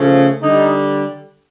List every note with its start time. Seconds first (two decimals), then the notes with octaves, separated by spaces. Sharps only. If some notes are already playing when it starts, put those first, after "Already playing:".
Already playing: C#3 F3 A3
0.41 D3 G3 D#4